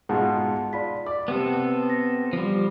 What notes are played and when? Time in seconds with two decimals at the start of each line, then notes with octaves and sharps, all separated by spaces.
0.09 G#2 B2 F4 G#4 F#5 A5
0.73 F4 D5 B5 B6
1.07 D5 D6
1.28 C3 B3 C4 A4
1.90 A#6
2.33 F3 G3